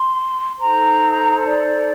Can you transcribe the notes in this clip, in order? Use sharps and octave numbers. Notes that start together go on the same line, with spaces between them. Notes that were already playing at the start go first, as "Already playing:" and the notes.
Already playing: C6
D#4 A4 C5 A#5
D5